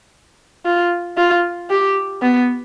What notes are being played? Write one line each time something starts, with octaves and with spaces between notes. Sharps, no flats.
F4
F4
G4
B3